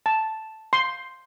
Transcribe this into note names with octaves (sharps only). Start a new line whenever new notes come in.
A5
C6